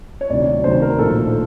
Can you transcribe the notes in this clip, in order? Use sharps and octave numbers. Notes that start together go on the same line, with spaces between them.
C#5
D2 C3 D#3 F#3 D5
D2 C3 D#3 F#3 C5
A#4
A#1 A2 F3 A4